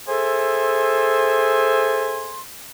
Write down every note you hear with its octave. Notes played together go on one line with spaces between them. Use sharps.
G#4 A4 C5 E5 G#5 C6